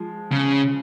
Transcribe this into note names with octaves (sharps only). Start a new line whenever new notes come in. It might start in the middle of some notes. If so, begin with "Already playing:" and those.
Already playing: F3 G#3
C#3